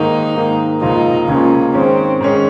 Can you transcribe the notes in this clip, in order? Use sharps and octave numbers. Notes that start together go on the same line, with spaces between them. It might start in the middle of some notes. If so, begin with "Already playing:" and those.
Already playing: G#2 D#3 A#3 D#4
G#2 D#3 A#3
C#2 C#3 F3 A#3 D#4 F4
C#2 C#3 F3 A#3 C#4 F4
G#2 D#3 G#3 C4 C#4
G#2 D#3 G#3 C#4